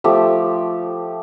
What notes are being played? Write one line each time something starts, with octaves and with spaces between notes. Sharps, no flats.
F3 A3 G4